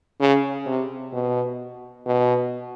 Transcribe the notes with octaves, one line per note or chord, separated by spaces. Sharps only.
C#3
C3
B2
B2